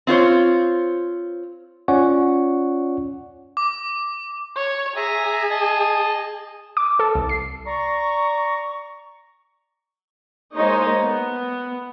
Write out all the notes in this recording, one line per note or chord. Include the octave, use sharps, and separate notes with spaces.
C4 F4 C5 C#5
C#4 F4 C#5 D5 F#5 C#6
D6
C#5
G#4 E5 G#5 A#5
D#5 A5
D6
A4
C2
C7
D5 A#5 C#6
G#3 A#3 D#4 C5 C#5 D#5
B3